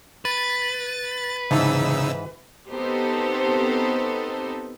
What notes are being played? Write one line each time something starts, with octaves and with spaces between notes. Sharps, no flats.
B4 A6
G#2 C#3 E3 D#4 A5 E6
B3 C4 D#4 G4 A4 C5